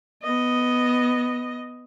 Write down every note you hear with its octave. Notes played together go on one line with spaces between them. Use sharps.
B3 D#5